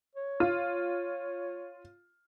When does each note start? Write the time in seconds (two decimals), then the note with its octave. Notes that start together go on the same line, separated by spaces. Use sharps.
0.15 C#5
0.40 F4